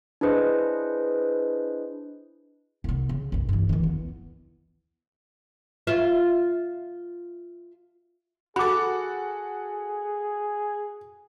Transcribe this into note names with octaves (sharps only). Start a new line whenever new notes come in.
D4 E4 G#4 B4 C5 D#5
C2 B3
C#3
B1 F#2
G2 E3
D#3 E3
E2 B3
F4 C#5 E5
F#4 G#4 A4 B5 D6